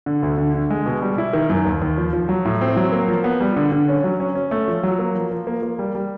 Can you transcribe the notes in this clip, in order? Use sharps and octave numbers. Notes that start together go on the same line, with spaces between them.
D3
D2
D3
D3
G#3
B2
G3
E4
D#3
F#2
D#2
D#2
F3
F3
F#3
A2
C4
F#3
A#3
F3
B3
G3
D3
D3
C#4
F#3
C#4
C#4
A3
F3
F#3
A#3
F3
F3
A#3
A#3
G3
G3